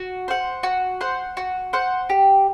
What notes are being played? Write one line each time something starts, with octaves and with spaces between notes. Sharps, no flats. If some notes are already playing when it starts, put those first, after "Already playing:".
Already playing: F#4
C5 F#5
F#4
C5 F#5
F#4
C5 F#5
G4